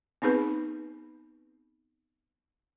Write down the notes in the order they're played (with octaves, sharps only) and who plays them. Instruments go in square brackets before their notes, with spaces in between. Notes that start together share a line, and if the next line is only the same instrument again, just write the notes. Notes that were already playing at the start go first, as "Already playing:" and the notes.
[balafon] B3 C4 D#4 G#4 B4